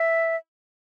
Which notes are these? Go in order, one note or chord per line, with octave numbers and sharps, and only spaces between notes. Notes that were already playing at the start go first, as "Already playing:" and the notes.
Already playing: E5